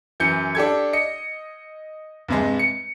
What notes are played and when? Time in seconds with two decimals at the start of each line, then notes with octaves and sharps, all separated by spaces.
0.20 F#2 E3 G6 C#7
0.55 D4 G4 A4 G#6
0.93 D#5 C#7
2.28 G2 C3 G#3
2.59 C#7